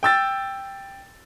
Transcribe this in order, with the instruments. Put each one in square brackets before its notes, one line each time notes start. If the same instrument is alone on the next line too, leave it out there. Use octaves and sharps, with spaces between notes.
[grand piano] G5 E6 A6